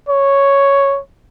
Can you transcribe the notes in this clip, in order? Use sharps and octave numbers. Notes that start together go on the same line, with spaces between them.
C#5